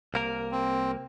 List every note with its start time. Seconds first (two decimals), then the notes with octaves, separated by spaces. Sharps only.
0.14 C2 A#3 A#4
0.51 C4